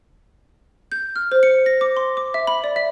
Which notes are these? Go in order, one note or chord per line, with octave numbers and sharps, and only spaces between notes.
G6
F6
C5
C#7
A#6
D6
C6
D6
E5
B5
D5
E5